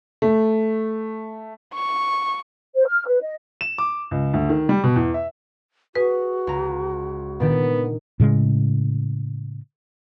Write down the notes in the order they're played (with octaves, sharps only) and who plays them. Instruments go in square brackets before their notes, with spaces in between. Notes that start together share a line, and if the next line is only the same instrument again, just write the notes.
[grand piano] A3
[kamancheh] C#6
[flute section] C5
F6
B4
D#5
[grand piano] E7
D6
C#2
D2
D#3
G3
B2
E2
E5
[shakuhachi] F#4 [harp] G#4 [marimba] B4
[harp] C#2 A#5
[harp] A#2 D#3 D4 [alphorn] B3
[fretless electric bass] A2 C#3 G#3